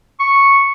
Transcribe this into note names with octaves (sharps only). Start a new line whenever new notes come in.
C#6